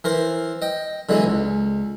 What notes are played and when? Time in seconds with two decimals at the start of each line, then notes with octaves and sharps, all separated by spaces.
0.04 E3 A#4 C5
0.62 D#5 G5
1.09 D3 E3 F#3 G#3 B3
1.24 C#2